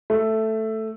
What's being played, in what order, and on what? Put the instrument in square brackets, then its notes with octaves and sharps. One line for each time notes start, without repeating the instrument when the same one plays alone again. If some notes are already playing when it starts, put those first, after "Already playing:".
[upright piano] A3